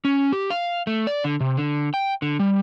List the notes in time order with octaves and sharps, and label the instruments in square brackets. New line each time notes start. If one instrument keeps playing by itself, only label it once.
[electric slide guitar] C#4
G4
F5
A3
D5
D3
C3
D3
G5
D3
G3